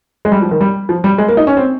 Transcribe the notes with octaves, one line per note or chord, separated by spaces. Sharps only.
G#3
G3
F3
D#3
G3
F3
G3
G#3
A#3
D#4
C#4
C4